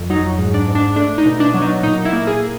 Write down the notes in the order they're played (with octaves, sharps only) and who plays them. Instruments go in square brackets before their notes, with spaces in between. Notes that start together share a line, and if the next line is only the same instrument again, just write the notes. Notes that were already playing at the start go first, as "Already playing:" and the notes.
Already playing: [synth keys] F2
F#3 D#4
G#2
D4
G#2
D4
A3 D4
D#4
B2
D4
F#3
D#4
A#2 D#4
E4
A#3
G#4